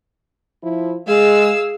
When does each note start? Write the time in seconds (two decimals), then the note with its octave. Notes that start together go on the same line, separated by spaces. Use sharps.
0.63 F3 E4
1.07 G#3 G#4 F5 E6